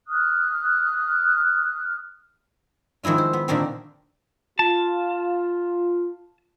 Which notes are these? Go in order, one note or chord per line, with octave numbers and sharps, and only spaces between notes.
D#6 F6 F#6
D#3 F3 G#3 E4 F4
C5
B3
A#2 D3 D#3 A3 A#3 C4
F4 A5